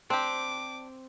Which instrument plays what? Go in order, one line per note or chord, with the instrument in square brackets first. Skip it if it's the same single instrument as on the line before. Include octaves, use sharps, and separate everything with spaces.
[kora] C4 [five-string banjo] D4 G4 [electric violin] D6